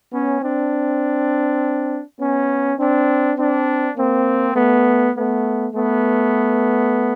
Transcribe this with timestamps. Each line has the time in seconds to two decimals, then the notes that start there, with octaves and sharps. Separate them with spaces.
0.12 B3 C#4
0.42 C4 D4
2.19 B3 C#4
2.79 C4 D4
3.37 C4 D4
3.97 A#3 C4
4.55 A3 B3
5.15 A3 B3
5.74 A3 B3